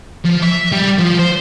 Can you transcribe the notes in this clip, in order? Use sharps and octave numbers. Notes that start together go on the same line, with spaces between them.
F3
E5
G3
F3
C5